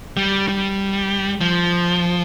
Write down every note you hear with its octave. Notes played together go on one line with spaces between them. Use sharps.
G3
G3
F3